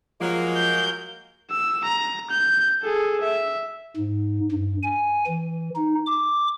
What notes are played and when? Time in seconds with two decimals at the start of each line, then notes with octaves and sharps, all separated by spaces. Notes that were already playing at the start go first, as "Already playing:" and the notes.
0.21 F3 F#3 G#3 A#3
0.56 G6
1.50 E6
1.84 A#5
2.30 G6
2.83 G#4 A4
3.21 E5
3.96 G#2
4.52 G2
4.83 G#5
5.27 E3
5.75 D#4
6.07 D6